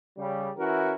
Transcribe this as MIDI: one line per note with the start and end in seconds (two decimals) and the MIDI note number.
0.18 0.50 49
0.18 0.50 55
0.57 0.94 52
0.57 0.94 61
0.57 0.94 64
0.57 0.94 66
0.57 0.94 70